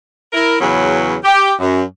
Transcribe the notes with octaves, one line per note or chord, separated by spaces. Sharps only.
E4 A#4
E2 C#3 F#3 C#4 B4
G4
F#2